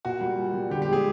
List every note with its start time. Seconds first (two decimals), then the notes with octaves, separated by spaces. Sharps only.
0.05 A#2 F#4
0.21 G3
0.39 A#2
0.54 G3
0.70 D3 G4
0.82 G4
0.88 F3 G#3 G#4